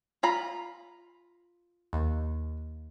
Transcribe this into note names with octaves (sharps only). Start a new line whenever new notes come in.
F4 A#5 B5
D#2